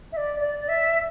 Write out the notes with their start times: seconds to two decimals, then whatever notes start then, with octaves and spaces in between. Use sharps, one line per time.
0.12 E5
0.17 D5
0.40 D5
0.68 E5